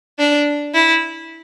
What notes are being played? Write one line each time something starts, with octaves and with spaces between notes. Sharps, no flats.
D4
E4